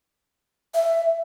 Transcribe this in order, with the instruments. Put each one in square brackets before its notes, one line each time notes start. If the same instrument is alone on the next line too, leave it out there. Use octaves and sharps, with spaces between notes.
[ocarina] E5